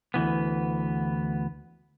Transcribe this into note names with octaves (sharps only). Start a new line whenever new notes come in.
D2 E3 B3